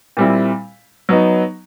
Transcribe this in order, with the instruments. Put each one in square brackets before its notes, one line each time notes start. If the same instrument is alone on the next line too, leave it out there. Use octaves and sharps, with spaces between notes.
[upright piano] A#2 G3 C4 E4
F#3 B3 D#4